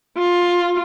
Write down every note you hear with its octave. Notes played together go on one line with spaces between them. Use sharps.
F4